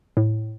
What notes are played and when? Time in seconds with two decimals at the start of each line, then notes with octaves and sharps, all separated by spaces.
0.17 A2